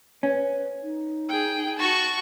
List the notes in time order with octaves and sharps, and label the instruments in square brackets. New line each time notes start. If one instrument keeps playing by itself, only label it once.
[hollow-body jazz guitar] C#4 [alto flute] B4
[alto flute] D#4
[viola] G#4 G5
[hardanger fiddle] F#4 C#6 [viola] A5